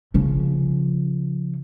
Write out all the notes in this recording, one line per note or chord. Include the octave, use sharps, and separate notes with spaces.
C#3 F3